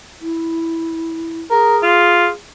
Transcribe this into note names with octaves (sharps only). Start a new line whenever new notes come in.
E4
G#4 A#4
F4